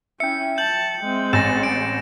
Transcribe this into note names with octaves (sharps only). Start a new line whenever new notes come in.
C#4 E4 E5 G5 C#7
A5 G6 F#7
G#3 C4
A1 G#5 A6 A#6 E7
D7